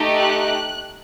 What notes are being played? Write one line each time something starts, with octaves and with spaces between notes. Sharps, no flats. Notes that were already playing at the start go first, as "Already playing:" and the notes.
Already playing: A3 D#4 G4
F#6